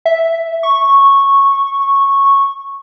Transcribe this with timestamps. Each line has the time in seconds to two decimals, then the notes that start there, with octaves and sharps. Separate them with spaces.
0.05 E5
0.63 C#6